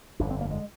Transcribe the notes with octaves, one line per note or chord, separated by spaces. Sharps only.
G1 F2 D3 D4
C4
A#3
G#3